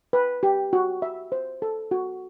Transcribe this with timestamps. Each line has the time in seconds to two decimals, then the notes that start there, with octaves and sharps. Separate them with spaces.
0.13 B4
0.43 G4
0.73 F#4
1.02 E5
1.32 C5
1.62 A4
1.91 F#4